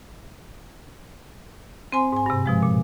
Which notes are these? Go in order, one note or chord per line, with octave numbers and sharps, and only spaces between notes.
C4 C5 G#5 C6
G#2 G#5
G2 C3
B2 F3 G#3
A#2